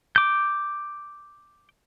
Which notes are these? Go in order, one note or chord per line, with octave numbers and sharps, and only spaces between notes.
D6 G6